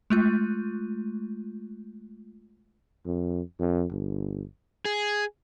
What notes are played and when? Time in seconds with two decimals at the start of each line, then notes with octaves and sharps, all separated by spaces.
0.10 G#3 A3 F4
3.06 F2
3.59 F2
3.91 G1
4.85 G#4